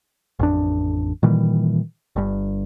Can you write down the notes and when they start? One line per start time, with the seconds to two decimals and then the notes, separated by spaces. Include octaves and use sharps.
0.39 A1 F2 D4
1.23 A#2 D#3 E3 G3
2.16 G1 G2